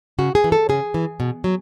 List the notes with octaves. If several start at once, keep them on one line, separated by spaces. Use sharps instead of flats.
C#3 F#4
G#4
E3
A4
C#3 G#4
E3
B2
F#3